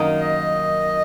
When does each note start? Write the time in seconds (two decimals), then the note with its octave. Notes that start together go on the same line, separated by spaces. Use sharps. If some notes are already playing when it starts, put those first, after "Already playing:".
Already playing: F#2 D#3 A#3 D#4
0.20 D#5